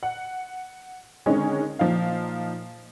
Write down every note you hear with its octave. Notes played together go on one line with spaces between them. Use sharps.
F#5
D3 D#3 G#3 C4 C#4 D#4
A#2 F3 D#4 F5